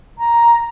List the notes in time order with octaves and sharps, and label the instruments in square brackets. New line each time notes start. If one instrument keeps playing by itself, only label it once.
[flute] A#5